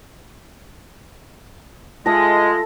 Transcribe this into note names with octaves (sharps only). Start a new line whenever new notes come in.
G#3 F4 A4 E5 A#6